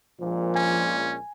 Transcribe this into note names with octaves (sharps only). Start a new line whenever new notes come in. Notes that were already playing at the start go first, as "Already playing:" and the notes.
A#1 A#2 F3 G#3
C#4 G#5